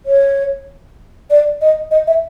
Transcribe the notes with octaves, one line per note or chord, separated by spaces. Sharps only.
C#5
D5
D#5
D#5
E5